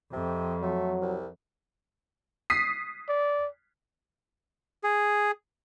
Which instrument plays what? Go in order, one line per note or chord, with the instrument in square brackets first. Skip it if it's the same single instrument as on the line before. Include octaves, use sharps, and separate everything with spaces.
[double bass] F2 [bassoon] C3
[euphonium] F#3 [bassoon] A3
[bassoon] C2
[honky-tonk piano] D#6 B6 C7
[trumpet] D5
[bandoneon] G#4